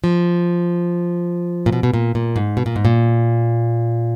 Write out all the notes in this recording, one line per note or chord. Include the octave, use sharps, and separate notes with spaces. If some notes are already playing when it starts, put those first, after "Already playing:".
F3
A#2
B2
B2
A#2
A#2
G#2
B2
A#2
G#2
A#2